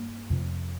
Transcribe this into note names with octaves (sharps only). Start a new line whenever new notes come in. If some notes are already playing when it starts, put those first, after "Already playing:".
Already playing: G2 A#3
F2 C3